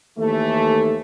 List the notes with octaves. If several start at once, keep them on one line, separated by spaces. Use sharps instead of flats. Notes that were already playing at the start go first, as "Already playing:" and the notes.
D#2 E3 A3